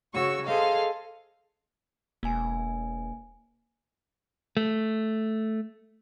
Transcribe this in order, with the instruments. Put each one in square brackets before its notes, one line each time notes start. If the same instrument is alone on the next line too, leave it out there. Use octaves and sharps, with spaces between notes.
[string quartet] C#3 F#4 C#5 C#6 E6
G#4 A4 C5 D#5 F5
[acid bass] E1 [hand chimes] A#3 G#5
[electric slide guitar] A3